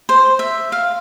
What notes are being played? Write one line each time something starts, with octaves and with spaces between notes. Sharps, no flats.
C5
E5
F5